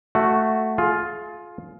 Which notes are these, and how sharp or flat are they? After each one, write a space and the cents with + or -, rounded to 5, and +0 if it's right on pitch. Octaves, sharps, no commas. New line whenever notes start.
A3 +0 F#4 +0
F4 +10 G#4 +35